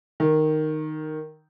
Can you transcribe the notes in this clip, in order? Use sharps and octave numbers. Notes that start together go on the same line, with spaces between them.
D#3